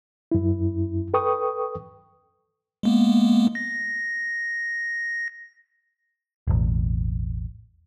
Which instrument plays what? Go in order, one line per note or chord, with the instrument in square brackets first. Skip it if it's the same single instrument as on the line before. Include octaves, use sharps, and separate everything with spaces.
[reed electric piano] F#2 E4
A4 B4 G5 C#6 D#6
[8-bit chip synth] G#3 A#3 B3
A#6
[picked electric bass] E1 A1